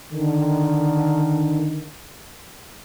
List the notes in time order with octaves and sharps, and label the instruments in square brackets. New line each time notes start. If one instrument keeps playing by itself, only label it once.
[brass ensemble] D3 D#3